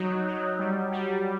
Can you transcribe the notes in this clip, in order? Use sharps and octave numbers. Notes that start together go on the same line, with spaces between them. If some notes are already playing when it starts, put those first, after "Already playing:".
Already playing: F#3 D#4
F#3
G3
G3